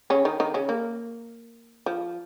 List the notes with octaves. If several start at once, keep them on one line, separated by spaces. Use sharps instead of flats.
C#3 C#4
D#3 D#4
D#3 D#4
C#3 C#4
A#3
F3